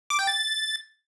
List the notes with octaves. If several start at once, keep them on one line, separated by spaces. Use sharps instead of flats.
D6
G5
A6